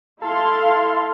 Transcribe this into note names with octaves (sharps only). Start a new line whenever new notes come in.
E4 A4 F5 C6